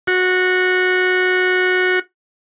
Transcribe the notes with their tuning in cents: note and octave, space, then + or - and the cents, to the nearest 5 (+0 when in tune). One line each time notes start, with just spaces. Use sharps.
F#4 -15